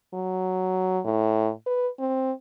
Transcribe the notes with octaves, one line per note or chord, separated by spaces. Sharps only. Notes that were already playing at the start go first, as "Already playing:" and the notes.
F#3
A2
B4
C4